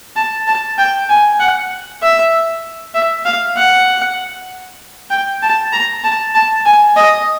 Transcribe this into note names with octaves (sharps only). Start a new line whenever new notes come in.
A5
A5
G5
G#5
F#5
E5
E5
F5
F#5
G5
A5
A#5
A5
A5
G#5
D#5